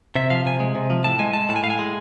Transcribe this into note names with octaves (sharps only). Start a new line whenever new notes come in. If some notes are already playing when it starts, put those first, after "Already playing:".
C3 E5
F3 F5
C3 G#5
G#3
C3
F3
A2 A5
G#3 G#5
G#3 A5
A2 A5
G#5
A2 F5
G#5
G#3